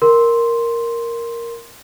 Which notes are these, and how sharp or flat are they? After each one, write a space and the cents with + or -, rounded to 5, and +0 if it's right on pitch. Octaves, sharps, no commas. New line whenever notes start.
A#4 +0 C6 +0